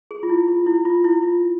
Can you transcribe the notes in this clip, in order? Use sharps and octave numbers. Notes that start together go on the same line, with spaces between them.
G#4
F4
E4
F4
E4
F4
E4
F4